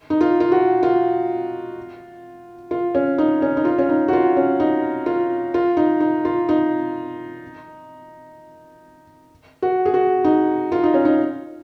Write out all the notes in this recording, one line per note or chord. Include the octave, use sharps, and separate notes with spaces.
D#4
F4
F4
F#4
F4
F4
C#4
D#4
C#4
D#4
F4
C#4
D#4
F#4
F4
C#4
D#4
F4
F4
D#4
D#4
F4
D#4
F#4
G#4
F#4
D#4
F4
D#4
C#4
D#4